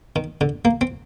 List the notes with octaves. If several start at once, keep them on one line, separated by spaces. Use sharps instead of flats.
D#3
D3
A#3
C4